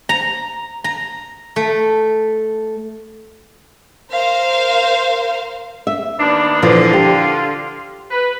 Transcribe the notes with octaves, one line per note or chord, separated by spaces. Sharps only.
A#5
A#5
A3
A#4 C5 F5
E5
D#2 B3 D4
A#2 D3 E3 F3 F4
G4
B4